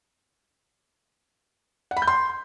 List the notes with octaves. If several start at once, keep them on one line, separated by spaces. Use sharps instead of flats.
F#5
B5
G6
C6